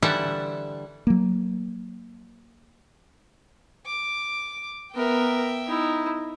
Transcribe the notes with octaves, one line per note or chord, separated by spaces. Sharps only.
D3 E3 G3 E5 F#5 A5
F#3 A#3
D6
B3 A#4 E5 G5
D#4 E4